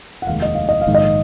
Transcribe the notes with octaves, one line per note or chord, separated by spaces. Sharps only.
F#5
F1 D#2 D#3 G#3 F5
D#5
F5
D#5
F5
A#1 G#2 D#3 G#3
D#5